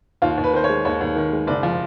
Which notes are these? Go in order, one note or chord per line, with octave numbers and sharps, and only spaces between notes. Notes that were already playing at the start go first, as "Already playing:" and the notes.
D#2 F4
D#2
B4
D#3 C5
C#5
G#3
D#2 C#5
D#2
D#3
G#3
F#1 D5
F3